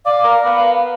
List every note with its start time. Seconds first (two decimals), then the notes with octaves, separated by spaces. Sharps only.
0.06 D5 F5
0.24 A#4
0.44 B3